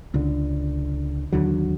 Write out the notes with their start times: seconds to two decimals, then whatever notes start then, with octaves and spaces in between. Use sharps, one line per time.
0.14 C#2 D3
1.32 D#2 D3 F#3